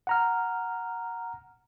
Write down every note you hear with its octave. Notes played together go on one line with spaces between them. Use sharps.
F#5 A#5 F6